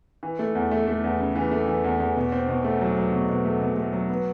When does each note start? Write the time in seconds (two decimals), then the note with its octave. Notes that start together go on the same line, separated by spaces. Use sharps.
0.23 E3
0.39 A3
0.55 E2
0.71 A3
0.87 A3
1.04 E2
1.20 C#3
1.36 E3
1.51 A3
1.68 E3
1.84 E2
2.00 E2
2.16 B2
2.32 C4
2.49 B2
2.65 A3
2.81 F#3
2.97 F#3
3.13 B2
3.29 B2
3.45 A3
3.61 B2
3.77 A3
3.93 F#3
4.10 B3